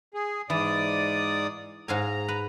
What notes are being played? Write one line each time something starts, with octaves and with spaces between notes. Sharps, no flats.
G#4
G#2 E3 D5 D#6
G#2 F5 G#5 A#5
B4